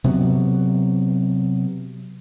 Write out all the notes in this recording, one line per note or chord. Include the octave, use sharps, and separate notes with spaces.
C3 F#3 B3